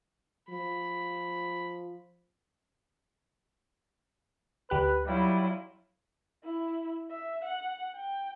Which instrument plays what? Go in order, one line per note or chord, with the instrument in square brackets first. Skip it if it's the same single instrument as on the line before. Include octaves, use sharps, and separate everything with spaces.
[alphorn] F3 [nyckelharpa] B5
[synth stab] D2 G4 F#6 [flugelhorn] B4
[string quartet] F#3 E4 F4 [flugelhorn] G3
[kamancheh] E4
E5
F#5
G5